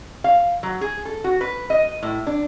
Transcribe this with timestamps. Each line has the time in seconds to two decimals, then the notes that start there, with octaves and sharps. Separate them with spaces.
0.24 F5
0.63 F#3
0.81 G#4
1.05 A4
1.24 F#4
1.41 B4
1.70 D#5
2.03 A2
2.27 D4